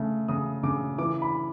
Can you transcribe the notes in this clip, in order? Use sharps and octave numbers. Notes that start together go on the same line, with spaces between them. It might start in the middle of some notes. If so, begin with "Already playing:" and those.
Already playing: C#3 A3
C#3 D#6
C#3 D6
E3 D6
B5